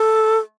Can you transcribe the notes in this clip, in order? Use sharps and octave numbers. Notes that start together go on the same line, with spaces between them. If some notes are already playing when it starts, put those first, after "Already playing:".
Already playing: A4